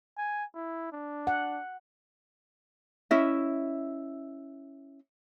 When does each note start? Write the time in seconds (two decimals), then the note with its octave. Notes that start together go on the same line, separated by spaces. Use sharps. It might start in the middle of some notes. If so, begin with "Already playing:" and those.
0.17 G#5
0.54 E4
0.92 D4
1.27 F#5
3.11 C#4 E4 D#5 E5